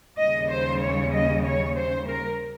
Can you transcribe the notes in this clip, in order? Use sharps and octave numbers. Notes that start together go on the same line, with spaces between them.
D#2 C#3 G3 D#5
C5
C#5
D#5
C#5
C5
A#4